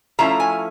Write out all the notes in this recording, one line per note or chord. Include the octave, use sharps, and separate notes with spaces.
F3 A3 C#4 E4 A#5
G#5